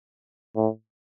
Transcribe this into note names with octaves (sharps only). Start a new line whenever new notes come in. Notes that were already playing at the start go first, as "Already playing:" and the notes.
A2